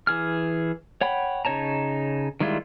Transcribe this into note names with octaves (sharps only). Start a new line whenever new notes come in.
E3 G#4 F6
C#5 F#5 G5 B5
C#3 D#4 C#5 A5 A#5
D#3 G3 G#3 E4 F4